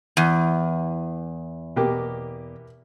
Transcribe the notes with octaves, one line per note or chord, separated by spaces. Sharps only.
E2
B2 A#3 G4